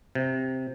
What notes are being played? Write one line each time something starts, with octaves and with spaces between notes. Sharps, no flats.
C3